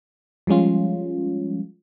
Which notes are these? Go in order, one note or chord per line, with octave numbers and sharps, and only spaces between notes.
F3 G3 G#3 C#4 F4